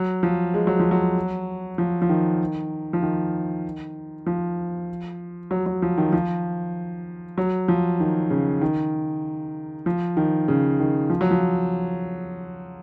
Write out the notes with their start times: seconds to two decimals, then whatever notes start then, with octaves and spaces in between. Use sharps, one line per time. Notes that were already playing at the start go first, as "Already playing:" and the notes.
Already playing: F#3
0.23 F3
0.54 G#3
0.67 F#3
0.80 F3
0.91 F#3
1.78 F3
2.02 F3
2.09 D#3
2.93 F3
3.02 D#3
4.26 F3
5.51 F#3
5.66 F#3
5.82 F3
5.98 D#3
6.13 F3
7.38 F#3
7.68 F3
8.00 D#3
8.30 C#3
8.61 D#3
9.86 F3
10.17 D#3
10.48 C#3
10.80 D#3
11.10 F3
11.21 F#3
11.31 F3